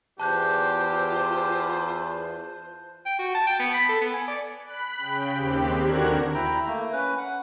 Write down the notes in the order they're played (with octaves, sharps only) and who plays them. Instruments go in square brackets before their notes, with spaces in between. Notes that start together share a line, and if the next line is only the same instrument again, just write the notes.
[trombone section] E2 [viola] F4 C5 [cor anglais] G4 [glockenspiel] A5 F#6 G6
[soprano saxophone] G5
F#4
A5
G5
B3
B5
A4
B3
G#5
D5
[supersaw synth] B5 F#6
C#3 G5
D#2 C4 G4
D3 D4 F#4 A#4 F#6 G#6
[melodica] E4 G5 A#5
A3 A#3
C#4 B4
F#5